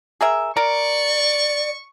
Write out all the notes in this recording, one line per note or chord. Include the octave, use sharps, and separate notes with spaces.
G#4 A#4 E5
A#4 D5 C#6